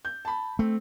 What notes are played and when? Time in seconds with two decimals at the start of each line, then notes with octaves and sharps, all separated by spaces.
0.05 G6
0.25 A5 B5
0.59 A3 C4